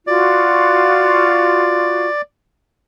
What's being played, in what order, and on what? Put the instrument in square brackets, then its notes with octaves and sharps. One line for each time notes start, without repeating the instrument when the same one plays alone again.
[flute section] F4 F#4 [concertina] D5